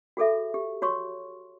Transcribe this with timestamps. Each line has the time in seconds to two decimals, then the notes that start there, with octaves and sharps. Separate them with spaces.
0.17 F#4 G#4 A4 E5
0.54 G4
0.82 F#4 C#5 C6 C#6